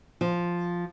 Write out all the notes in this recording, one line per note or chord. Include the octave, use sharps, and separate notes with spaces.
F3